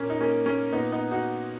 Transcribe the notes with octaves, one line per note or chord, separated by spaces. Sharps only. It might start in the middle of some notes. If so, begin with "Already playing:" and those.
Already playing: A#2 A#3 C#4
D#4
A#3 C#4
A#3 C#4
A#2 B3 D#4
B3 D#4
D#4 F#4